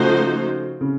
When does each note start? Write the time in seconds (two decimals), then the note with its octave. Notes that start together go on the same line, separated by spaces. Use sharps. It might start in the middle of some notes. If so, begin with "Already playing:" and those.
Already playing: C#3 F3 A3 D#4 F#4 C5
0.81 C#3